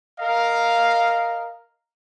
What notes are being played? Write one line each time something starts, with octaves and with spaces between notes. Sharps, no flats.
A#4 D#5 F5